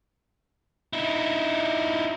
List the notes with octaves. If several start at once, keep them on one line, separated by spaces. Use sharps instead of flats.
D#4 E4